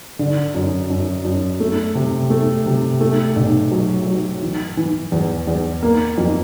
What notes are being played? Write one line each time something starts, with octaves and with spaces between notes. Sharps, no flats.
D3
F#2
F#2
F#2
A3
C3
A3
C3
A3
B1
F#3
F#3
E3
E3
E2
E2
A#3
F2